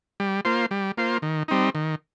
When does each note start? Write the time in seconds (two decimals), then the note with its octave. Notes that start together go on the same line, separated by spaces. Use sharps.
0.20 G3
0.45 A#3 F4 C5
0.71 G3
0.97 A#3 F4 C5
1.22 D#3
1.48 G3 C4 D#4
1.75 D#3